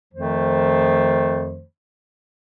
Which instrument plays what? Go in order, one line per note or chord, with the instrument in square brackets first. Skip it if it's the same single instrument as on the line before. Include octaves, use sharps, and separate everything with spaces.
[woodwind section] F2 D#3 F3 A3 C5